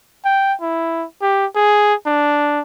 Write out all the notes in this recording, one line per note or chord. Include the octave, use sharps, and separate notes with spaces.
G5
E4
G4
G#4
D4